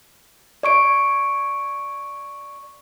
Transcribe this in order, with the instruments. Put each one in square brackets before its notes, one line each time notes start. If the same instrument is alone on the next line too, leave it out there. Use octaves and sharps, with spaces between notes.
[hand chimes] D5 C#6 D7